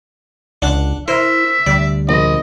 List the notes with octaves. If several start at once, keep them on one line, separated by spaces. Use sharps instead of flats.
C#2 D4 F#5
E4 A#4 C5 E5
D2 D3 G3 D5
A#1 D#5